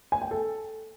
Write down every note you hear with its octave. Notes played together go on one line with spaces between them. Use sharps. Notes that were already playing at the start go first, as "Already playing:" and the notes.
G#5
G5
A4